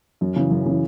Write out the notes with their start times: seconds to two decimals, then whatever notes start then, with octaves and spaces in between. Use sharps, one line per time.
0.21 F#2
0.36 C#3 E3
0.51 F#2
0.66 C#3 E3